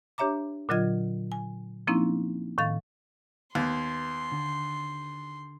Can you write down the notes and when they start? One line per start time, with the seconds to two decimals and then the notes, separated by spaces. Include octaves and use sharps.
0.18 D4 G4 C#5 E5 A#5 D6
0.69 A#2 D3 F#3 F4 D#5 G#6
1.32 G#5
1.87 F3 A#3 C4 C#4 D#4 E4
2.58 A2 D#3 F5 A6
3.55 D#2 B3 C6
4.32 D3